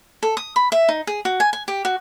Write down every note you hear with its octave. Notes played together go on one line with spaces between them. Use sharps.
A4
D#6
B5
E5
D#4
G#4
F#4
G#5
G#5
G4
F#4